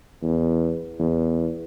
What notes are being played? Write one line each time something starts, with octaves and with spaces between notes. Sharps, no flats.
E2
E2